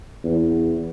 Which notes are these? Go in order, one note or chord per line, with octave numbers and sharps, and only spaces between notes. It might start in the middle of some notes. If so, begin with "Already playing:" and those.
E2